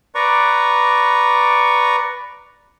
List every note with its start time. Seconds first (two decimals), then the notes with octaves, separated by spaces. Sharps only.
0.15 B4 D5 A#5 C#6